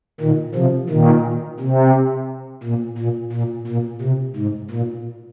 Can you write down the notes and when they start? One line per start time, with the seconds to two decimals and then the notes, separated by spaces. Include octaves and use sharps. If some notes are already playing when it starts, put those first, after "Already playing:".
0.21 A#2 D#3
0.55 C3 F3
0.90 A#2 D#3
1.60 C3
2.63 A#2
2.98 A#2
3.33 A#2
3.67 A#2
4.01 C3
4.36 G#2
4.71 A#2